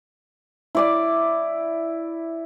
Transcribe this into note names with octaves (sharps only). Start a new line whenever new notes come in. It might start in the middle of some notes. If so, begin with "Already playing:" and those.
E4 D5 D6